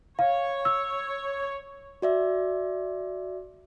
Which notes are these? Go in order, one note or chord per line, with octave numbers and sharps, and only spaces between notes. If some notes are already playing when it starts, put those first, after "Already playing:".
C#5 F5
E6
F#4 D5 E5